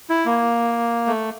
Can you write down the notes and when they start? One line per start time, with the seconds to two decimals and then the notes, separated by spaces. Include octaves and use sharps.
0.10 E4
0.26 A#3
1.07 A3